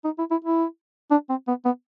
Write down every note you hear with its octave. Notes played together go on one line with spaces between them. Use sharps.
D#4
E4
E4
E4
D4
C4
B3
B3